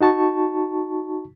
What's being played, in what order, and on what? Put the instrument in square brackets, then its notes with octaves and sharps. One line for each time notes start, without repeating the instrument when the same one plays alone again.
[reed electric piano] D#4 F#4 A5 C#6